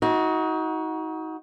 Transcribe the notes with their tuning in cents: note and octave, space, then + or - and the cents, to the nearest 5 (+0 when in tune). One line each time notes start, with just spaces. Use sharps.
D#4 +30 F#4 +0